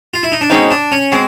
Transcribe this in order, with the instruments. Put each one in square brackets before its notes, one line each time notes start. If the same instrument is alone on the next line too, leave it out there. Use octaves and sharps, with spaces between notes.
[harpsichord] F4
E4
D#4
D4
[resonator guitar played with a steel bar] B2 G#3 C4 D#4 [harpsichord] C#4
[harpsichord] D4
C#4
[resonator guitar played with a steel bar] B2 G#3 [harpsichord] C4